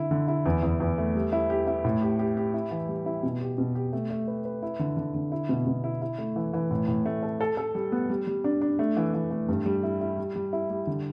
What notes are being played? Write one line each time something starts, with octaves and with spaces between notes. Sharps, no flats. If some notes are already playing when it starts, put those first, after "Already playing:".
Already playing: D3 E4
D3
E4
E2
E2
E2
A3
G3
E4
G4
E4
A2
G4
G4
G4
E4
E3
G3
E4
B2
G4
B2
G4
A3
A3
B4
B4
E4
D3
D3
D3
E4
B2
B2
E4
E4
A3
E3
E3
A2
A2
A3
A4
A4
A4
G3
B3
G3
G3
D4
D4
A3
E3
E3
A3
G2
G3
E4
E4
G3
G3
E4
G3
D3